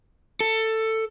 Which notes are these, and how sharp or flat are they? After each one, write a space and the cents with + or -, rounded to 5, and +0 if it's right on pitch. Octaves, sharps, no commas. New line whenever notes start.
A4 +15